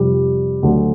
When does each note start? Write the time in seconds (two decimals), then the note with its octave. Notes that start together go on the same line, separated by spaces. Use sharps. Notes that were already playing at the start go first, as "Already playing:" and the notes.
Already playing: F2 C3 F3 G3 G4
0.63 D2 D3 F#3